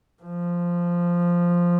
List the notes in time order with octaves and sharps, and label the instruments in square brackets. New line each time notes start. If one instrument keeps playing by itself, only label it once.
[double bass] F3